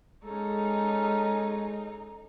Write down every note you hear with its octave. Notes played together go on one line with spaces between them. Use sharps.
G#3 C#4 D#4 A4